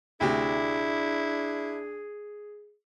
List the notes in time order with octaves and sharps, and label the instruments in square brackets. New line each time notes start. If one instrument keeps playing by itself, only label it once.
[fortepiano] D2 C3 [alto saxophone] D4 [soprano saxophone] E4 [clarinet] G#4